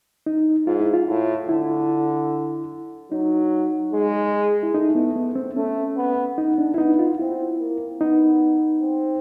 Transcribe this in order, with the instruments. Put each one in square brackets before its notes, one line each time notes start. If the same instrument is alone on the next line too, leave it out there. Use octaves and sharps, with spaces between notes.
[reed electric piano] D#4
[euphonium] G#2 [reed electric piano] F4
[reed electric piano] E4
F4
[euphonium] A2
[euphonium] D3 [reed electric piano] E4
[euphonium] F#3 [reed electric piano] D#4
[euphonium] G#3
[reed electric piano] E4
[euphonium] A3 [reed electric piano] D#4
[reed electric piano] B3
B3
C4
[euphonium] A3 [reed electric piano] C#4
[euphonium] B3
[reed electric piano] D#4
D4
E4
[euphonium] B3 [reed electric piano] D#4
[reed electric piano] F4
[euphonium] C4 [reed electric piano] E4
[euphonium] A#3
[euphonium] B3 [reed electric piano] D#4
[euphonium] C4